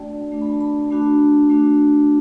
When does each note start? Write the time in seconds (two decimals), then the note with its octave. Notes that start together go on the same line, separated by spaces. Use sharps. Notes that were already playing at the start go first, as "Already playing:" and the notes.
Already playing: A3 D4 F#4 D5 G5 A5
0.32 A3 D4 F#4
0.42 B5
0.51 A5
0.61 B5
0.91 A3 D4 F#4 A5
1.50 A3 D4 F#4